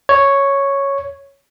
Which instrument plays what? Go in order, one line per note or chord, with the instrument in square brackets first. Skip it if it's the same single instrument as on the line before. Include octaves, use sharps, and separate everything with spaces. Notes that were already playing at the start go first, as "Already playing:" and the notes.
[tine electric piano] C#5